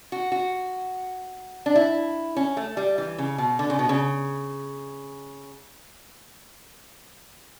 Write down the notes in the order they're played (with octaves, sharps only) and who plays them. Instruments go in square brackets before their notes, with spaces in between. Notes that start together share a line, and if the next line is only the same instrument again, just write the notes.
[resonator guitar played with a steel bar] F#4
F#4
D4
E4
C#4
A3
G3
E3
C#3
B2
D3
C#3
B2
C#3